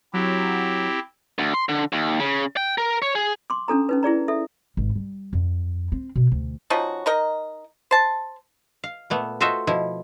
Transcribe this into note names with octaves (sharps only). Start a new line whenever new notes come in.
F#3 C4 E4 G4
D2
C6
D3
D#2
C#3
G5
A#4
C#5
G#4
C6 D6
C#4 D4 A4 A#5
C#4 D#4 B4
E4 G#4 D5 A#5
A4 E5
G#1
G3
F2
C4
B2
D2
F3 C#4 D#4 F#4
D#4 A#4 D#5
C5 A5
F5
A#2 A3 B3
F4 F#4 A4 C5 D#5 E5
B2 F3 E4